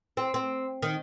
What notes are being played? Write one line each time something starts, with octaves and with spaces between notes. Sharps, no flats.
C4
C4
D#3